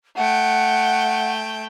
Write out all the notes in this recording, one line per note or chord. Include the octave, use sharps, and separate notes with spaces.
A3 F#5 G5